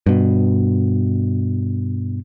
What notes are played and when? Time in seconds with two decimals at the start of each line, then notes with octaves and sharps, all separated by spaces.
0.06 G2 B2